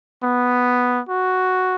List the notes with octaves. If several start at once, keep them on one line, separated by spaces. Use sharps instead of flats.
B3
F#4